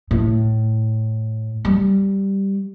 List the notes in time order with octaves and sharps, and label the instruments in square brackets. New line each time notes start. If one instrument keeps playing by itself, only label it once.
[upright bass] A2
G3